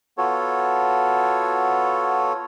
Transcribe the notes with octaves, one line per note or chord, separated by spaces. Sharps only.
B3 F4 F#4 A4 C#5